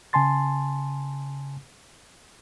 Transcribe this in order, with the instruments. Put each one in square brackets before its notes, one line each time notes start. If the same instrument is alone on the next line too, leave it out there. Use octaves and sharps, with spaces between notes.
[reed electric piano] C#3 G#5 A5 C6 A6